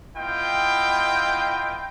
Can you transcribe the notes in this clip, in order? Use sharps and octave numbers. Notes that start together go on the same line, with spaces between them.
B3 E4 F4 D#5 G5